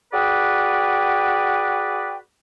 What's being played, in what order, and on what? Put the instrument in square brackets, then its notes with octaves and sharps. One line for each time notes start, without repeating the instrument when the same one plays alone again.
[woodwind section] F#4 G#4 B4 D5 G5